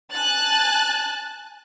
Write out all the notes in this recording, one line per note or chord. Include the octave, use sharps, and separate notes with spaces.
G#5 A5 F#6 A6